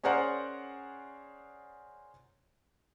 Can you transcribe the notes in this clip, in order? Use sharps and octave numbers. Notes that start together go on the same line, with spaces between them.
C#4 G#4 A#4 C5 D5 F#5